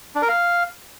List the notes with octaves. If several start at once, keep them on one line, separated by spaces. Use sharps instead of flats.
D4
A#4
F5